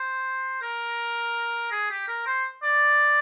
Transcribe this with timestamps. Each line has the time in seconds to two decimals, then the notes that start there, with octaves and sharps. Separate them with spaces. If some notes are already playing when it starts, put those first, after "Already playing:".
Already playing: C5
0.62 A#4
1.72 G#4
1.91 G4
2.08 A#4
2.27 C5
2.63 D5